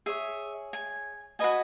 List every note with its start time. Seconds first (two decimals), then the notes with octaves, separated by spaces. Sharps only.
0.06 G#4 C#5 E5
0.73 G#5
1.39 F#4 B4 D#5 G#5